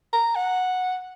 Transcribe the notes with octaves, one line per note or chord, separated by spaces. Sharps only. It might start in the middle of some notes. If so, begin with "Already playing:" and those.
A#5
F#5